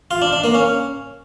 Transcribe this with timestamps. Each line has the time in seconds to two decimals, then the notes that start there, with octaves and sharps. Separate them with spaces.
0.11 F4
0.22 D4
0.33 D4
0.44 A#3
0.55 C#4